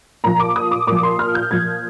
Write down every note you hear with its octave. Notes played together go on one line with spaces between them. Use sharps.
A#2 F3 A#5
D6
D#6
D6
A#2 F3 D6
C6
F6
G6
A#2 F3 G#6